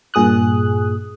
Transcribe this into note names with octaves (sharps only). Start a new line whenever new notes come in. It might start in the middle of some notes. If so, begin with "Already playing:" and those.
G2 A#2 G#4 D#6 F#6